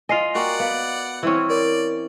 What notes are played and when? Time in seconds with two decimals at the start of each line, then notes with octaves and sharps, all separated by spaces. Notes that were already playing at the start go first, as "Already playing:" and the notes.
0.09 F4 D#5 G#5 C7 F7
0.35 A#3 F#4 D5 F#5 G5
0.60 B3 F5
1.23 E3 C4 C#4
1.50 A#4 C#5 D5 C#6